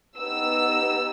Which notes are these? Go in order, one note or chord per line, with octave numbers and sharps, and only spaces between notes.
B3 D#4 G4 E6